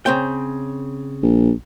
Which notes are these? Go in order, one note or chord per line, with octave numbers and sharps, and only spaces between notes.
C#3 C4 G5
A#1